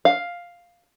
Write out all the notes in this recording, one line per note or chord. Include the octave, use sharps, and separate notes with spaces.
F5